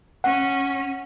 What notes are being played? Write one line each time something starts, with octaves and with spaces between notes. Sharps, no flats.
C#4 F#5